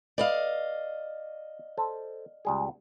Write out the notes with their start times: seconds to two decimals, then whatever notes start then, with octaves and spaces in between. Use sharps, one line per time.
0.18 B4 D5 D#5 F5
1.78 A4 C5
2.45 C#2 G3 G#4